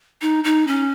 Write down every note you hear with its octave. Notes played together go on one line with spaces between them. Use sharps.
D#4
D#4
C#4